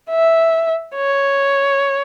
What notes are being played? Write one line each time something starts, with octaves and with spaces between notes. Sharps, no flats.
E5
C#5